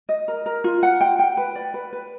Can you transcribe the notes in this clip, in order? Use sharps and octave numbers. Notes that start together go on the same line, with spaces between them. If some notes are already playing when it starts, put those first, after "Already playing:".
D#5
A#4
A#4
F4
F#5
G5
G5
B4
D5
B4
B4